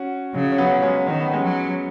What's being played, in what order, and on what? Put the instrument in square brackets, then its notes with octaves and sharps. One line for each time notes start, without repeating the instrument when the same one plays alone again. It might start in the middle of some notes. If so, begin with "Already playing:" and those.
Already playing: [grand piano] C#4 F#4
[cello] C#3 [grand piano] F#3
[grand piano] C#4
F#3 B3
G#3 C#4
[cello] D#3 [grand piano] C#4
[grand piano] B3
G#3 C#4
[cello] F#3